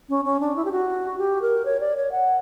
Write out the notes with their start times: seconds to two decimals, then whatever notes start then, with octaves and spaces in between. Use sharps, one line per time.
0.09 C#4
0.25 C#4
0.40 D4
0.56 E4
0.65 G4
0.72 F#4
1.19 G4
1.42 A#4
1.65 C#5
1.80 D5
1.96 C#5
2.12 F#5